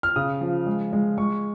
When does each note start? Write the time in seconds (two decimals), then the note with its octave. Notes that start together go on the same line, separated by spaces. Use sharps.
0.03 F6
0.16 C#3 D#6
0.41 F3
0.66 G#3
0.93 G#3
1.18 G#3 C#6